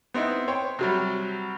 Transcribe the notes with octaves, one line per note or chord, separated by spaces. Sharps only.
B3 C4 D#4 E4
C5 C#5 G5
C3 F#3 G3